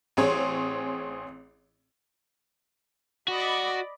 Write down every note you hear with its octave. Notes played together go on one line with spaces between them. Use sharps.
A1 C4 G#4 C#5
F#4 D5 D#5 B5